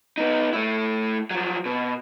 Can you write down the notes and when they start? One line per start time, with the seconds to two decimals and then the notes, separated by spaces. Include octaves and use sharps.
0.18 B3 D#4
0.53 A3 E4
1.31 F3 F#3
1.66 B2